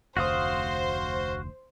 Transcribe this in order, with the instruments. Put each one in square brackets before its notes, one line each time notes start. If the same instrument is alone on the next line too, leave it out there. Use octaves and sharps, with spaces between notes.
[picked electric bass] F1 D2 [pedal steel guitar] F#4 F5 D#6 [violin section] C5